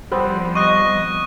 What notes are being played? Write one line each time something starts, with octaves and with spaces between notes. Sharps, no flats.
F3 G3 B3 C4 B4
D#5 C#6 F#6